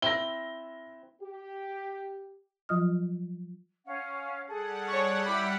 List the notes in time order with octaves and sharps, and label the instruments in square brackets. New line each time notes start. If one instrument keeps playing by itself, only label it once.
[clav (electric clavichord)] C4 E4 [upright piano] A#6 G7
[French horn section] G4
[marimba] F3 F#3 F4 D#5 D#6 F6
[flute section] C#4 F5 F#5
[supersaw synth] G3 F#5 [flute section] G#4 A4
[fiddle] C#5 C#6
[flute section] E4 G4 D6 [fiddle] B5